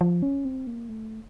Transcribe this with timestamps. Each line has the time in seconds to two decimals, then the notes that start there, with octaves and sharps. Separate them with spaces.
0.01 F3
0.23 C#4
0.45 C4
0.67 A#3
0.89 A3